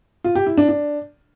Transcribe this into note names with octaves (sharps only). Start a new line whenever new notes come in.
F4
G4
E4
D4
D4